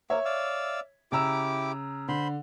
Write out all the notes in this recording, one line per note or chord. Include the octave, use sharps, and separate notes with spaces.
A#3 C#5 E5
D5 F5 E6
C#3 E4 G4 A#5 D6 E6
D3 C5 B5 C6